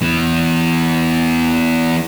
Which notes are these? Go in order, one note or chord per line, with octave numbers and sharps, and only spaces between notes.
E3 B3